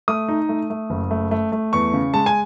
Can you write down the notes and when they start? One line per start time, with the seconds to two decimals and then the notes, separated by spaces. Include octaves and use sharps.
0.08 A3 D#6
0.29 D#4
0.49 A3
0.70 A3
0.90 F#1
1.11 A3
1.31 A3
1.52 A3
1.73 E2 C#6
1.94 C#3
2.13 G#3 A5
2.26 G#5